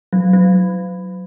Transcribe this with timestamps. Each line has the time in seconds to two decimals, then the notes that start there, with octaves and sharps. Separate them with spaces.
0.13 F#3
0.33 F#3